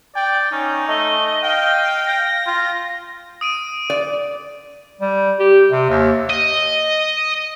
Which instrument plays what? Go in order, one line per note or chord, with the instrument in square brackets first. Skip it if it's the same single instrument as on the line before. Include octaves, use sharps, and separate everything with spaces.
[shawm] D5 [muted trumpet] G5
[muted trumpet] C#4 [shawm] D#4
[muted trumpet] A3 [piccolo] D#5
[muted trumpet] F5 [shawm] G5
[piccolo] A#6
[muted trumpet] F4
[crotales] D#6 D7 D#7
[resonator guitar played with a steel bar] D5
[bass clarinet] G3
G4
C3
D#2
[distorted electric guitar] D#5